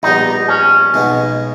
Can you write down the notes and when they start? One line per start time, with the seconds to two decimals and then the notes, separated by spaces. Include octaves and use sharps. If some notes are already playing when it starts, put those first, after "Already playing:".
0.03 A#1 A#2 G3 B3 D#4
0.48 C#4
0.94 B1 B2 G#3 B3